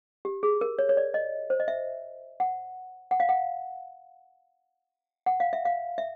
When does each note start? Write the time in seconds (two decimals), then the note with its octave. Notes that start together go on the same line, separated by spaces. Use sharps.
0.25 G4
0.43 G#4
0.61 A#4
0.79 C#5
0.89 C#5
0.97 D5
1.14 D#5
1.50 C5
1.60 D#5
1.68 E5
2.40 F#5
3.11 F#5
3.20 F5
3.29 F#5
5.26 F#5
5.40 F5
5.53 E5
5.65 F5
5.98 E5